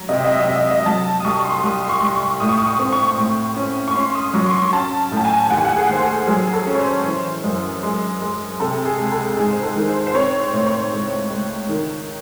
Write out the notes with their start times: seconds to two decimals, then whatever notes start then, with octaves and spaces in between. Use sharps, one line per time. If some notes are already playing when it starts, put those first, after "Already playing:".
Already playing: F#3
0.09 C3 D#5
0.17 E5
0.25 D#5
0.32 E5
0.40 D#5
0.47 C3 E5
0.56 D#5
0.64 E5
0.71 D#5
0.86 F#3 A5
1.20 D#6
1.24 C2 C#6
1.45 C6
1.63 C2 D#6
1.84 C6
1.89 C#6
2.02 C2
2.15 C#6
2.40 A2 D#6
2.49 C#6
2.58 D#6
2.67 C#6
2.79 C4
2.92 C#6
3.18 A2
3.57 C#4
3.88 C#6
3.95 C#4 C6
4.15 D#6
4.34 F#3 C#6
4.46 C6
4.54 C#6
4.73 C#4 A5
5.11 A2
5.17 A5
5.25 G#5
5.50 D#2 F#5
5.58 G#5
5.65 F#5
5.76 G#4
5.89 D#2 C5
6.02 A4
6.27 F#3 G#4
6.53 A4
6.67 C#4
6.75 C#5
6.79 C5
7.06 E3
7.44 F#2
7.83 G#3
8.21 G#3
8.60 C3 A4
8.85 G#4
8.98 C#2
9.12 A4
9.37 G#2 G#4
9.53 C5
9.63 A4
9.76 D#3
9.89 C5
10.07 C5
10.14 C4 C#5
10.40 C5
10.53 A2
10.66 C#5
10.92 C#2
11.30 C#2
11.69 D#3